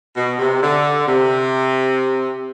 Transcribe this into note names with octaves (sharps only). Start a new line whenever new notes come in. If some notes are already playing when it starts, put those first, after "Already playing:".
B2
C3
D3
C3